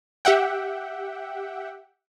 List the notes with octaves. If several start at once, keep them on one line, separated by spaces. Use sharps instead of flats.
G4 E5 F#5 G5